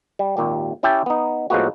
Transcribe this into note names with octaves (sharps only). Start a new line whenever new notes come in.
G3
G#1 D#2 A#2 G4
C#4 E4 G4 E5 G5 A5
B3 D#4
A2 F3 G#3 A#3 B3 F#4